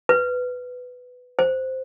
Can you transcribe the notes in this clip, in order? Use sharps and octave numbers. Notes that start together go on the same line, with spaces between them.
B4
C5